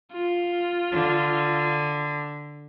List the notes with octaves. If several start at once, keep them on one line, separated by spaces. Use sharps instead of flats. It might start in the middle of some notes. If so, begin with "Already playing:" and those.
F4
D3